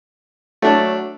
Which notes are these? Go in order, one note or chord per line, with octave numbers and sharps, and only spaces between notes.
F#3 A3 D4